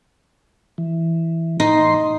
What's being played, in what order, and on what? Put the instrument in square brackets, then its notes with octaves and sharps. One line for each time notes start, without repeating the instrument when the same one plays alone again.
[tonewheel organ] E3
[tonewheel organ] A2 C6 [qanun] D#4